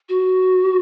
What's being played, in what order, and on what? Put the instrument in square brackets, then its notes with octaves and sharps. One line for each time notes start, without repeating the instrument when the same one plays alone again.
[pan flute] F#4